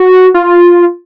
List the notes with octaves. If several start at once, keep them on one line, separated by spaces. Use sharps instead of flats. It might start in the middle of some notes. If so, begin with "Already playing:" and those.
Already playing: F#4
F4